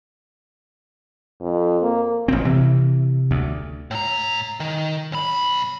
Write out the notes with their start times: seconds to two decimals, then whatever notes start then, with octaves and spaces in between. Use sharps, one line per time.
1.41 F2
1.82 A#3
2.28 A1 B2 C4
2.45 C3 E3
3.31 D2
3.91 A2 A#5
4.60 D#3
5.12 B1 B5